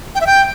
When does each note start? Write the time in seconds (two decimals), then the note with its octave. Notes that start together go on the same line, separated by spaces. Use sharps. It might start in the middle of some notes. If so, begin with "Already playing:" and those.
0.15 G5
0.21 E5
0.27 G5